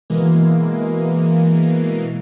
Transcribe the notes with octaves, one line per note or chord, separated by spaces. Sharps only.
B2 E3 G#3 A#3